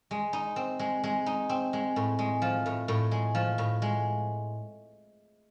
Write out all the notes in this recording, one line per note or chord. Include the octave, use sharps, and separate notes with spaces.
G#3
D#4
C4
G#3
G#3
D#4
C4
G#3
A2
G#3
F3
A2
A2
G#3
F3
A2
G#3